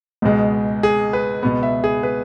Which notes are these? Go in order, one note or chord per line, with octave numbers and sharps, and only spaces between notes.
C#2 B2 G#3
G#4
B4
C#2 B2 B3
E5
G#4
B4